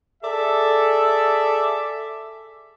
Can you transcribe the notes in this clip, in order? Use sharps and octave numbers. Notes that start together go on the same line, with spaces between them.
G#4 A4 D5 E5